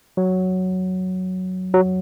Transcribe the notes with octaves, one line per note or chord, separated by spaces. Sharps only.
F#3
F#3